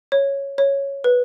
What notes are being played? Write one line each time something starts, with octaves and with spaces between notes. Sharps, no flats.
C#5
C#5
B4